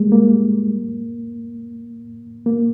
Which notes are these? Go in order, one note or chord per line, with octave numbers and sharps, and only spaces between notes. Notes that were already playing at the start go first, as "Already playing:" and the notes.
Already playing: G3 G#3 A#3
A#3
A#3